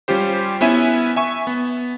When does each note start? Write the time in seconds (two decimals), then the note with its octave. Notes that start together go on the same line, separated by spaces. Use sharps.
0.08 G3 C#4 F4 G4 C5
0.61 B3 C#4 E4 B4 E5 G#5
1.16 E5 G#5 C#6
1.47 B3